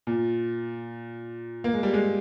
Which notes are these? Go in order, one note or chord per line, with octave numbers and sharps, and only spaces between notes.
A#2
A#3
G#3
G3
G#3